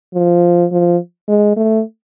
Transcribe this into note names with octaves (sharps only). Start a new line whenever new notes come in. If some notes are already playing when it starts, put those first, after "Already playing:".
F3
F3
G#3
A3